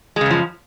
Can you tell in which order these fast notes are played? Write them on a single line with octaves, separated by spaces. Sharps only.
G#3 C#3 F#2 F3